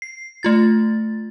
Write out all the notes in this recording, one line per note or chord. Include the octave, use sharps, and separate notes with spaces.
C7
A3 F4 A6